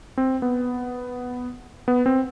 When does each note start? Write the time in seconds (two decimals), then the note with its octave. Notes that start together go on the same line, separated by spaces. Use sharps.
0.17 C4
0.42 B3
1.88 B3
2.06 C4